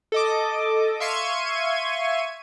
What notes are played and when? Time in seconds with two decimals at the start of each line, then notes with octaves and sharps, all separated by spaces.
0.12 A4 D#5 D6
1.00 E5 F5 C6 C#6 G#6 D#7